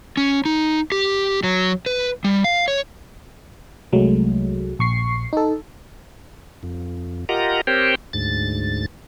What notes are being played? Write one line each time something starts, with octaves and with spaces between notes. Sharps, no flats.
C#4
D#4
G4
F#3
B4
G3
F5
C#5
C2 F#3 G#3 A3
A#1 C#6 C7
D#4 A4
F2
F4 G4 A#4 D#5 F#5 A#5
C4 G4 A#4 C5 C#5 G5
D2 G#2 A6